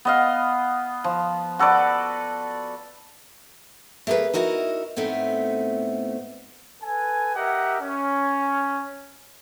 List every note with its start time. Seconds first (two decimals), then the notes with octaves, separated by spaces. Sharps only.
0.05 B3 D#5 F5
1.04 F3
1.59 F#4 A4 B4 D5
4.07 A3 A#3 G#4 A#4 B4
4.34 D#4 E4 F#4 A#4 D#5
4.96 A2 A3 B3 C4 D#4
6.83 A4 B4 G#5
7.36 G4 A#4 D#5 E5 F#5
7.81 C#4